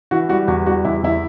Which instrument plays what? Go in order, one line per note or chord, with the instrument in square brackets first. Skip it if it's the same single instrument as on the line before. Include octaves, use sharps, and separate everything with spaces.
[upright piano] E3 F#4
G3 F#4
E2 F#4
G3 F#4
E2 E4
E2 E4